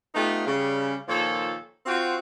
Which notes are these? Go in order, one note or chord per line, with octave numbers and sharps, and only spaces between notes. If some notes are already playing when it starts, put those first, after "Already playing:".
A3 B3 D#4 F4 G4
C#3 G3
A#2 D#3 F3 A4 C#5 A5
C4 F4 F#4